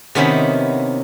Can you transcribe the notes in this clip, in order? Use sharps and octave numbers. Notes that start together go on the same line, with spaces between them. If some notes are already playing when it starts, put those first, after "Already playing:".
C3 D#3 B3 C#4 E4 B5